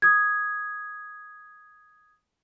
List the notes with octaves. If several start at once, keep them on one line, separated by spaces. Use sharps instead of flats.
D#6 G#6